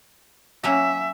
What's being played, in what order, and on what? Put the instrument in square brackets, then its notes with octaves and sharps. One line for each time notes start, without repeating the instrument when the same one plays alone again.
[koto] F#3 A#3 C#4 [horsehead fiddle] E5